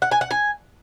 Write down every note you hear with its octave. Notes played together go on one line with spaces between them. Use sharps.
F#5
G#5
F#5
G#5